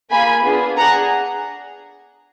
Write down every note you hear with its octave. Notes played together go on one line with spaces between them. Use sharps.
A#3 F4 G#4 G#5 B5
B3 D4 F4 G#4
D4 G#4 F#5 A#5